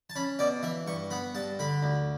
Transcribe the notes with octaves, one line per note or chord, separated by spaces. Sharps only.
A5
C#4 B5
B2 D5
E3 E5
G2 C#6
B3 B5
G2 A5
D3 B5
D2